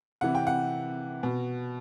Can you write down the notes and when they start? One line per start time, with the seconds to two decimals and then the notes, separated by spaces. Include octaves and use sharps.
0.21 C3 E3 F#5
0.35 G5
0.47 F#5
1.23 B2